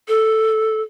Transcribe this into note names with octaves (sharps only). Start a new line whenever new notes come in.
A4